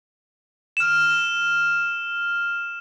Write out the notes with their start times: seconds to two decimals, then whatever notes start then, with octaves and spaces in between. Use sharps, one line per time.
0.77 F6 E7